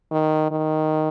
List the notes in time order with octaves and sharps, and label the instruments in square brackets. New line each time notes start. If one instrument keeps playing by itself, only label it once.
[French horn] D#3
D#3